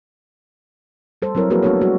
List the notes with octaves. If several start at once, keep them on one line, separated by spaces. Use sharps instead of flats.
G3 A4 C5
F#3 C4 E4 A#4 C#5
F3 A#3 F#4 G#4 A#4 B4
A3 B3 D4 F#4 A4 C#5
G3 F#4